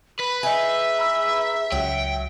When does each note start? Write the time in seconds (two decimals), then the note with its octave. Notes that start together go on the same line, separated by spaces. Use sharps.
0.19 B4 B5
0.43 D#4 G#4 E5
0.99 A#5 B5 E6
1.72 C#2 F#3 G5